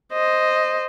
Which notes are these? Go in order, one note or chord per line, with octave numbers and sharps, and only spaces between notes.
C5 D#5